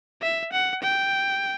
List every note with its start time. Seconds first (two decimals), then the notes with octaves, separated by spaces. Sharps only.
0.22 E5
0.53 F#5
0.83 G5